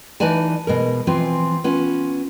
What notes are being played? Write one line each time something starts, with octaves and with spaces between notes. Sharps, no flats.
E3 D#4 B4 D5 G#5 A5
B2 G#3 A#4
E3 F3 C4 F4 G#5
B3 C#4 F4